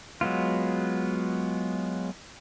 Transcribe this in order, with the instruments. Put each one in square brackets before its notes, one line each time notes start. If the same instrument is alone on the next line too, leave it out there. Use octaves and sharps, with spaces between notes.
[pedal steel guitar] F#3 G#3 B3 F4